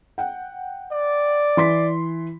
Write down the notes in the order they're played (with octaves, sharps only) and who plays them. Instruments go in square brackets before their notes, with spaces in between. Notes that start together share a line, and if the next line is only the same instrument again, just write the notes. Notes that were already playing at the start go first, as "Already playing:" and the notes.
[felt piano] F#5 G5
[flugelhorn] D5
[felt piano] E3 C6 B6